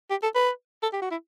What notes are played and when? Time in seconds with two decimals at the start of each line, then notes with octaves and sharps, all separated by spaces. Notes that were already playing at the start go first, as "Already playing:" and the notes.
0.10 G4
0.23 A4
0.35 B4
0.82 A4
0.93 G4
1.02 F#4
1.11 E4